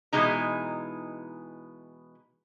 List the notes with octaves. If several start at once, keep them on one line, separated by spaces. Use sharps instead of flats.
B2 E3 G#3 D#4 A#5